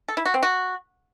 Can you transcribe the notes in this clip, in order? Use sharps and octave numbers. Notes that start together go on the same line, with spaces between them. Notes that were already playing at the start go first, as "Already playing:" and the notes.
A4
E4
F#4
C4
F#4